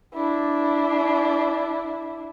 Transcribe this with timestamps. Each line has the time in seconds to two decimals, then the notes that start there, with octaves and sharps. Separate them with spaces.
0.14 D4 E4